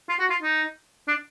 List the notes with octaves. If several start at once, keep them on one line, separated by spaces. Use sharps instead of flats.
F4
F#4
F4
D#4
D4